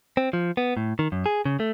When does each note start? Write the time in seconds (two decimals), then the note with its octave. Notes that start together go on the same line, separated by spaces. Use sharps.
0.17 C4
0.33 F3
0.57 B3
0.77 A2
0.99 D#3
1.12 F#2
1.26 G#4
1.45 C#3
1.60 A3